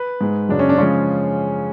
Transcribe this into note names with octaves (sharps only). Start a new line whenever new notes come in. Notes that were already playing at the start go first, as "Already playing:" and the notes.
Already playing: B4
G#2 G#3
F#2 C#3 G#3 D4
C#4
D4
C#3 F3 G#3 C#4